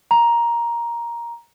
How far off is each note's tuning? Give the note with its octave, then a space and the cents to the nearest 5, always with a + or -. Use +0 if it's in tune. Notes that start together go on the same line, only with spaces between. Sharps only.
A#5 +10